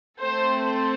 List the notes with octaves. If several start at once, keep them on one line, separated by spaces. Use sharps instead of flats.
A3 C4 A4 C5
C5